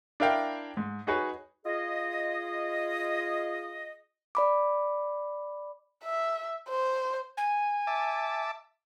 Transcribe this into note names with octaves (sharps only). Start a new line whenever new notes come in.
D4 E4 A#4 F5 G5
G#2
D#4 F#4 G#4 B4 C#5
F4 G#4 D#5
D5 B5 D6
E5
C5
G#5
E5 A5 D6